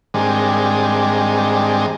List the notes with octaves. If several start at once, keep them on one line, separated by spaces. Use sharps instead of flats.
G#2 D#3 G3 G#3 C4 D4